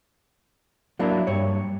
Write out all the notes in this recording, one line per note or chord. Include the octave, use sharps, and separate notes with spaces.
F#3 A#3 D4 E4
G2 C#5